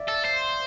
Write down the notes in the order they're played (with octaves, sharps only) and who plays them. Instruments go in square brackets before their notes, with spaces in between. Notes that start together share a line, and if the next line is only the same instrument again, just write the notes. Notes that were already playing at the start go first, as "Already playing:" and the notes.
Already playing: [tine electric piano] D5 E5 F5
[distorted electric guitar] A4
C5